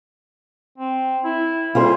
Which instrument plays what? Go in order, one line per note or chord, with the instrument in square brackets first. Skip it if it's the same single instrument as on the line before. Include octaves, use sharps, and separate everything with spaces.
[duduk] C4
E4
[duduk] G3 [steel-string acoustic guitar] F4 G#4 C5